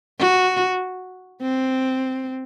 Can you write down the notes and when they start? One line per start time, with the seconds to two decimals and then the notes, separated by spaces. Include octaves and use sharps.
0.19 F#4
1.42 C4